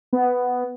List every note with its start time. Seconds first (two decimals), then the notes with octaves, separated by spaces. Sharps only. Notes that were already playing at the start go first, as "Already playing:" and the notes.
0.13 B3